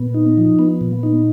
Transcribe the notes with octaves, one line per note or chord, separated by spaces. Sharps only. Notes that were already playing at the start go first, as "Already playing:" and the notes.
Already playing: A#2 B3
D#4
F3
B3
A#2
D#4